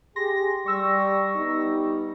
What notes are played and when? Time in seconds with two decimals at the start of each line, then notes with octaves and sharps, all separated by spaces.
0.16 G4 G#4 C6 A#6
0.66 G3 C#6 E6 A#6
1.35 G3 B3 D#4